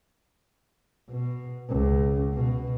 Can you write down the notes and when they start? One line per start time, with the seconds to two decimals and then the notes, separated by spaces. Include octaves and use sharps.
1.10 B2
1.69 C#2
2.35 B2